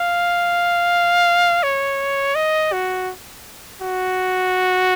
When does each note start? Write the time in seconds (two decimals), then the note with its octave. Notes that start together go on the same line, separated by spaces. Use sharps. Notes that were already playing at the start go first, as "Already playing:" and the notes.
Already playing: F5
1.63 C#5
2.36 D#5
2.73 F#4
3.81 F#4